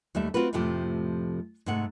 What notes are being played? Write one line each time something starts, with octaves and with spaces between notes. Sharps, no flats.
D#2 G3 A3 E5
C4 F4 F#4 B4
F2 A2 C3 F3 A3 G4
G#2 C3 A3 F#5